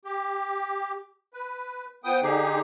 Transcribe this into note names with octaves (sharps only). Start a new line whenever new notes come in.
G4
B4
F3 B3 G5 D#6
D3 D#4 G4 G#4